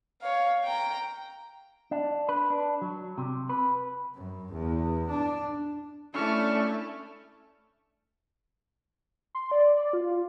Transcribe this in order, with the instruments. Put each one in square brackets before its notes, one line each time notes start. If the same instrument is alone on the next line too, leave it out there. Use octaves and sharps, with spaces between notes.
[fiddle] C#5 F5
G5 A#5
[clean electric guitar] D4
B4
D4
F#3
C3
B4
[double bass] F#2
E2
D4
[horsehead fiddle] A3 A4 [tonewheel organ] C#4 E4 [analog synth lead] D4 [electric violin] C#6 F6
[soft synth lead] C6
D5
D5
F4